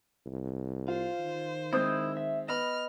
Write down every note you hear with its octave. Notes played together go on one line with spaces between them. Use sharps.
C2
F4 C5 F5
D#3
G#3 C4 E4 D#6 G6
E5
B3 D#5 B5 F6